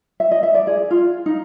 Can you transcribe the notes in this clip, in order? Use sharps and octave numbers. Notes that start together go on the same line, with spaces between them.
E5
D#5
E5
D5
G#4
F4
D#4